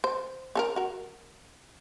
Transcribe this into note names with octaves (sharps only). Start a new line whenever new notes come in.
C5
C#4 A4 A#4
F#4 A#4